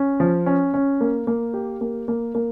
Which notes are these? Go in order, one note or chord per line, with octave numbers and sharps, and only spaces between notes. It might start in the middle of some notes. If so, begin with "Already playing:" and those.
Already playing: C#4
F3
C#4
C#4
A#3
A#3
G4
A#3
A#3
A#3